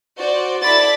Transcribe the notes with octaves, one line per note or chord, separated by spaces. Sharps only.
F#4 C5 D5
E4 A4 D5 B5 D6 A6